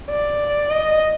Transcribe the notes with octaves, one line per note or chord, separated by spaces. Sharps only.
D5
D#5